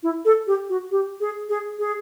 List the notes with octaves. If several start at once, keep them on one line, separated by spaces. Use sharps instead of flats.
E4
A4
G4
F#4
G4
G#4
G#4
G#4